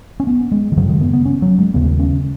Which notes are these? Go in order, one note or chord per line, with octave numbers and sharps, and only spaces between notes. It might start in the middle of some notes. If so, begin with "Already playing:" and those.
C#4
B3
G#3
D#3
F#2 C#3 F#3
D#3
B3
B3
C#4
F#3
G#3
D#2 C#3 B3
C#4